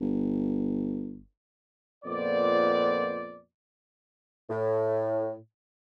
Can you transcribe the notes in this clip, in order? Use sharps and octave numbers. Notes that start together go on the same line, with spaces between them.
G1
F2 A#2 B3 C5 D5
A2